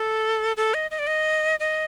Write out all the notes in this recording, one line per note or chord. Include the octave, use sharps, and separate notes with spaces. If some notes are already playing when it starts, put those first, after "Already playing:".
Already playing: A4
A4
D#5
D#5
D5
D#5
D#5